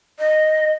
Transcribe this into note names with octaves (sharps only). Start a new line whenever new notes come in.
D#5